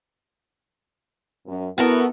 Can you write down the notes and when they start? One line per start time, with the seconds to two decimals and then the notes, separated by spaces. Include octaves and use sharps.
1.47 F#2
1.78 B3 E4 F#4 A4 A#4